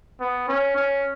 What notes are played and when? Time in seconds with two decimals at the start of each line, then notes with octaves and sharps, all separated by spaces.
0.21 B3
0.48 C#4
0.76 C#4